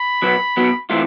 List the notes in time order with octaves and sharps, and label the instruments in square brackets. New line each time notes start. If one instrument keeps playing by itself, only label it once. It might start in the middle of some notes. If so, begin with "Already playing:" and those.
Already playing: [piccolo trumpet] B5
[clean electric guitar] B2 F#3 B3
B2 F#3 B3
E3 A3 C4 F4